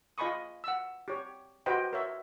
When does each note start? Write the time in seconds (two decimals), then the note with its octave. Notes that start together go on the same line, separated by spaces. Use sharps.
0.18 F4 D#5 G#5 B5 C#6 D#6
0.64 F#5 E6
1.08 G4 C#5
1.66 F#4 G4 B4 C5 D#5 G5
1.93 A#4 C#5 E5